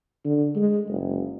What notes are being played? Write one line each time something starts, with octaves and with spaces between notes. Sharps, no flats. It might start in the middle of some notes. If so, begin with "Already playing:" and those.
D3
G#3
F#1